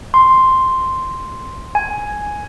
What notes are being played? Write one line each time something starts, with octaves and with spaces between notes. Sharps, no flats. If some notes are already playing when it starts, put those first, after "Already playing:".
C6
G#5